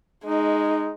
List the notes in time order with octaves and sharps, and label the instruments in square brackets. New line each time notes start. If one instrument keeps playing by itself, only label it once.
[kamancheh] G#3 [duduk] D#4